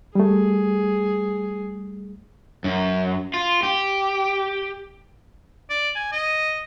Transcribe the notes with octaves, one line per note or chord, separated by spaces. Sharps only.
G3 A3 G#4
F#2
F4
G4
D5
G#5
D#5